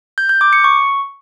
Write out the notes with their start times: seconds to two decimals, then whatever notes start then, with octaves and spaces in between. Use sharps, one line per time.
0.18 G6
0.29 G6
0.41 D6
0.53 C#7
0.64 C#6